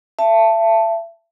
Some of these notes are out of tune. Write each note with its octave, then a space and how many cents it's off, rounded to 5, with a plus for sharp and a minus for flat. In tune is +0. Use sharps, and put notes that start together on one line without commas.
E5 +35 A5 +5